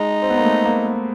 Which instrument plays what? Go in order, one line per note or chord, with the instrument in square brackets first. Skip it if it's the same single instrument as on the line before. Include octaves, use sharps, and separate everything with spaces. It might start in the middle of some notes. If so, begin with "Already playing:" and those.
Already playing: [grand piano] G#3 [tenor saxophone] D#4
[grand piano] C4
B3
A#3
A3
A#3
B3